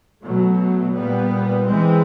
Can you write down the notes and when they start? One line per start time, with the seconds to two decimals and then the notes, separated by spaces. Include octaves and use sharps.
0.23 B2 F#3 A3
0.93 A#2 G3 B3
1.65 E3 G#3 C4